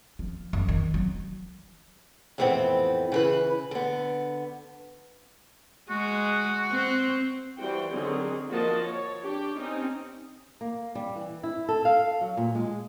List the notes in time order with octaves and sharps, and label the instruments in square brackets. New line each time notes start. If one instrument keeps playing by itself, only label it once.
[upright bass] F3
F#2
D#3
F#3
[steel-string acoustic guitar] F2 A2 E3 B3 C4
C#3 E3 B4
D3 B3
[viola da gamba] G#3 [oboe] F#4
[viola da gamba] C4
[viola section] E3 G3 F#4 C5 G5
D3 D#3 F#3 C4 G#4
F3 A#3 F#4 A#4 D#5 A5
C#5
D4 G4
C4 C#4 D#4
[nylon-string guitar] A#3
G3
E3
E4
A4
F5
F#3
A#2
G#3